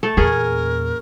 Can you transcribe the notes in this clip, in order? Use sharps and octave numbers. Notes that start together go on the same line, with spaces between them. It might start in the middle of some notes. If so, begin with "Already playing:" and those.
A3 A4
E2 A#2 C#4 G#4 A#4